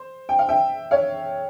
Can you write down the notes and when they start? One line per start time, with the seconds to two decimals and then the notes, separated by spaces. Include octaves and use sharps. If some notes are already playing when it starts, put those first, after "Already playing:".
Already playing: C5
0.29 G5
0.39 F5
0.49 E5 G5
0.91 C#5 F5